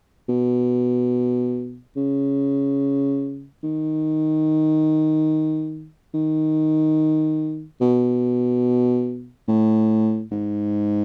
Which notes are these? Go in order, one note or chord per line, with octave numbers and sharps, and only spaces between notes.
B2
C#3
D#3
D#3
B2
A2
G#2